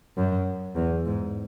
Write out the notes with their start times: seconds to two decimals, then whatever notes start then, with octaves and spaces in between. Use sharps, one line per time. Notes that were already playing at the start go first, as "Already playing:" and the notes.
0.17 F#2
0.76 E2
1.05 G#2